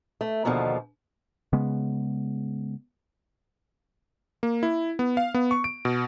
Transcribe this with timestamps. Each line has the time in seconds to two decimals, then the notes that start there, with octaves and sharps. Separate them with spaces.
0.21 A3
0.45 D#2 B2 D3 D#3 F3
1.53 C#3 G#3 B3
4.43 A#3
4.63 E4
4.99 B3
5.17 F5
5.34 B3
5.51 C#6
5.64 D7
5.85 B2